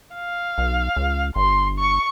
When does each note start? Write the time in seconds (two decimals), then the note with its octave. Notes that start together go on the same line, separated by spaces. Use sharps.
0.15 F5
0.58 B1
0.96 C#2
1.36 G1 C6
1.79 C#6